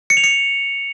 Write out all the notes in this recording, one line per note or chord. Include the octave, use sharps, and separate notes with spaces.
C#7
F7
C#7